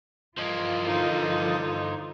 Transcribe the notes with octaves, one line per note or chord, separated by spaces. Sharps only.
E3 F3 A#3 F4 C5 D#5
D3 D#4